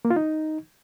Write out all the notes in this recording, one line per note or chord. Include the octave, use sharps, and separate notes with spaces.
A#3
F4
D#4